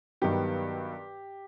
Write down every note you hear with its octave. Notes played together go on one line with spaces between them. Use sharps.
G2 D#3 F#3 B3 G4